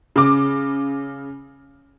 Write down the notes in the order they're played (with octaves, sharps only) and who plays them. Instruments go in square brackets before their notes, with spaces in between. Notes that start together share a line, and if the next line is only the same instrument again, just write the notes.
[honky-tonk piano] C#3 D6